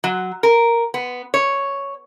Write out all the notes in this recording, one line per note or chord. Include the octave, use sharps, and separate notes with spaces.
F#3
A#4
B3
C#5